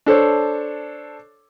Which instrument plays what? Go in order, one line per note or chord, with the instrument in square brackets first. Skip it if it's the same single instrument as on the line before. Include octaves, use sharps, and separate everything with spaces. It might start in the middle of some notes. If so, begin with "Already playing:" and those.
[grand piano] D4 A4 C5 C#5